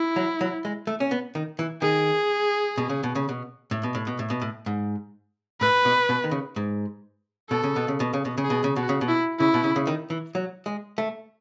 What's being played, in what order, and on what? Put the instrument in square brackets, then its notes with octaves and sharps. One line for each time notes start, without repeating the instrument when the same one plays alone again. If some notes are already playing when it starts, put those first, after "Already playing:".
Already playing: [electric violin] E4
[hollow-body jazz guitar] F#3
F#3
G#3
A3
C#4
B3
D#3
E3
[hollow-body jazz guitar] D#3 [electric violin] G#4
[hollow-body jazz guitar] B2
C#3
B2
C#3
B2
A2
B2
A2
B2
A2
B2
A2
G#2
[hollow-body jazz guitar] A2 [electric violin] B4
[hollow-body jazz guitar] B2
B2
D#3
C#3
G#2
[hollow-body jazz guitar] B2 [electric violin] A4
[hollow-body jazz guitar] C#3
B2
C#3
B2
C#3
B2
C#3
[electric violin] G#4
[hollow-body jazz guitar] B2
C#3
[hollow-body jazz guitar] B2 [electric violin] F#4
[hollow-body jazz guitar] C#3
B2
[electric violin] E4
[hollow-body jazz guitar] C#3 [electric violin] E4
[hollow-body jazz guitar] B2
C#3
C#3
D#3
E3
F#3
G#3
A3